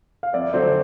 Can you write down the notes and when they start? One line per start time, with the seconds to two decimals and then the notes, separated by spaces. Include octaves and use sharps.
0.23 F5
0.33 F2 D5 E5
0.54 D3 F#3 A3 C4 C5 D5